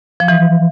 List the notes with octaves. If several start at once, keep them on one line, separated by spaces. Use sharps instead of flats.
F3
E3